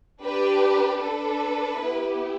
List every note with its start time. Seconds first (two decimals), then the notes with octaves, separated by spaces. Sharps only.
0.23 D4 G4 B4
1.02 D4 A4 B4
1.81 B3 E4 G4